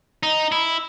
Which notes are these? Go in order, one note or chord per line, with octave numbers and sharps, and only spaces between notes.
D#4
E4